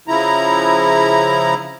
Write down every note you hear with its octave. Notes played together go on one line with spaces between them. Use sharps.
C#3 F3 E4 A#5